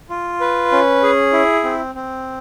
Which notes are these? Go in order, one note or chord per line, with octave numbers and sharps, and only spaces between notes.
F4
B4
C#4
G#4
E4
C4
C4